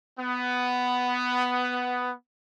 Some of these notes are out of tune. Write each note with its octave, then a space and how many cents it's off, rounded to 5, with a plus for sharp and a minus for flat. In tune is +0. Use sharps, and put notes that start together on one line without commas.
B3 +10